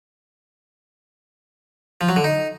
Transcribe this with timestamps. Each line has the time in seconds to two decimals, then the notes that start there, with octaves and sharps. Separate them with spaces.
2.01 F3
2.09 F#3
2.16 D3
2.24 D#4